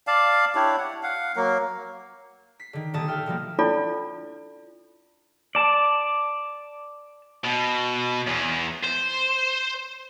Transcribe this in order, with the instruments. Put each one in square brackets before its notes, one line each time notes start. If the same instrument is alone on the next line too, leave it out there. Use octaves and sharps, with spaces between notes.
[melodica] D5 F5 A5
D4 E4 G4 C#5
F#5
F5 F#5
F#3 A#3 A#4
[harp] B6 C7
D3 D#3
D#1 D3 A4 A5 D#6
E5 G5 F6
B2 F3 G3 A#3
[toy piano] C#4 D4 E4 F4 A4 D5
[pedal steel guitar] D5 A5
[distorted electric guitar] B2
E2
C5